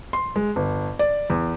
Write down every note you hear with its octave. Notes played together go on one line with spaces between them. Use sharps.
C6
G#3
G1
D5
E2